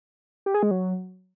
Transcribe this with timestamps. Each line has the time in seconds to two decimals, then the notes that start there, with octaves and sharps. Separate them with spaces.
0.46 G4
0.54 G#4
0.63 G#3
0.71 F#3